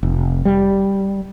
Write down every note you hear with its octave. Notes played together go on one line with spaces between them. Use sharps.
F1
G3